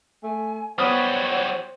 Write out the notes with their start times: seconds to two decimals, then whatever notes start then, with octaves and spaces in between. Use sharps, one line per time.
0.23 A3 G#5
0.78 F#3 G3 B3 C5 C#5 D#6